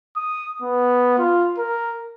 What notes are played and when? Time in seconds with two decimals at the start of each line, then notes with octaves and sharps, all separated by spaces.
0.16 D#6
0.62 B3
1.18 F4
1.58 A#4